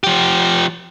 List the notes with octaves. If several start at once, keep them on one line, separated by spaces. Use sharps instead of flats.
F3 G4